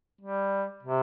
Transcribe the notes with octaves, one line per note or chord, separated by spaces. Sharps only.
G3
C3